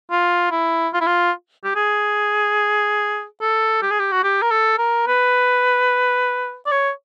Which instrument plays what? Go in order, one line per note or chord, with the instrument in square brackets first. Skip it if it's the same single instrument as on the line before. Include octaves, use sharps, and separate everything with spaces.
[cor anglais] F4
E4
F4
E4
F4
G4
G#4
A4
G4
G#4
G4
F#4
G4
A#4
A4
A#4
B4
D5
C#5